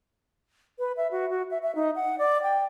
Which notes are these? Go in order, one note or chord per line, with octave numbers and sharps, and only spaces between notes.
B4
E5
F#4
F#4
E5
E5
D#4
F#5
D5
G5